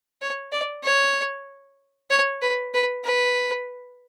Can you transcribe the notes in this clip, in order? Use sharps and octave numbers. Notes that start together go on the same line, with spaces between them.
C#5
D5
C#5
C#5
B4
B4
B4